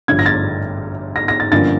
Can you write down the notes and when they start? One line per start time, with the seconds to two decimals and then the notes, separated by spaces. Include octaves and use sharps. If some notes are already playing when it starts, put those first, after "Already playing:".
0.08 A1 G2 D3 F3 G#6
0.19 A#6
0.26 A6
1.16 A#6
1.28 A#6
1.40 A6
1.52 G2 D3 F3 A#3 C#4 A6